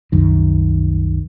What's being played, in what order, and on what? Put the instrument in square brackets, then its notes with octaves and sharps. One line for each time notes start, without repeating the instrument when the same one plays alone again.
[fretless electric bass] C2 F#2 D#3